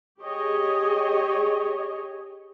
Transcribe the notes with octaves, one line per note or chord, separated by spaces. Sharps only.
G4 G#4 C#5 D#5